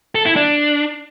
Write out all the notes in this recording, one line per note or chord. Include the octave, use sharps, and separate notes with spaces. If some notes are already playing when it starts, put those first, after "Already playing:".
A4
E4
D4